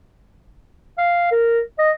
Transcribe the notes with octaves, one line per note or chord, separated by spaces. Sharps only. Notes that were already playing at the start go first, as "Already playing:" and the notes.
F5
A#4
D#5